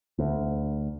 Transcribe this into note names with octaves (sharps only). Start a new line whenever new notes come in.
D2